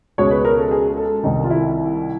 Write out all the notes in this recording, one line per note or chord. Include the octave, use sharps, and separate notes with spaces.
C#2 B2 G#3 C#5
B4
A#4
A4
G#4
A4
C2 C3 D#3 D#4
F4
E4